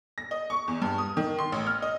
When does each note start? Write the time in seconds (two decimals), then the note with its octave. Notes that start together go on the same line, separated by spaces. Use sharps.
0.18 A#6
0.31 D#5
0.50 C#6
0.68 E2
0.82 G2
0.98 D#6
1.17 D#3
1.39 C6
1.52 A1
1.67 F6
1.82 D#5